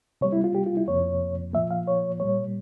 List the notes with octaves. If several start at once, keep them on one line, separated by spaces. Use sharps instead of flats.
C3 G3 A#3 C#5
E4
F4
G4
F4
E4
F2 C3 F3 A#3 C#5
A#2 F3 A#3 E5
F5
C#5
A#2 G3 A#3 C#5